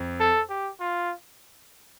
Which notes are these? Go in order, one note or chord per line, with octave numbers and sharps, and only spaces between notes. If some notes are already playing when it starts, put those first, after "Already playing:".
Already playing: F2
A4
G4
F4